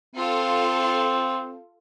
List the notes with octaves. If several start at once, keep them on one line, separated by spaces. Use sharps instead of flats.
C4 F4 A4